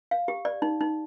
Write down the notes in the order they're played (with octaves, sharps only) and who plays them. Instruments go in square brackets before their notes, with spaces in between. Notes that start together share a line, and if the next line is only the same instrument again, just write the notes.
[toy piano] F5
G4
D5
D#4
D#4